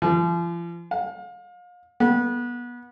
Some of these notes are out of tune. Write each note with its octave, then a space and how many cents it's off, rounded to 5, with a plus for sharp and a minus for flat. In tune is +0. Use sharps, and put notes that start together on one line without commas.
F3 -40
F5 +35
B3 -25